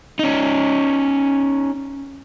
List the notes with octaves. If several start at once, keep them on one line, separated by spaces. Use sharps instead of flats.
C#4 D#4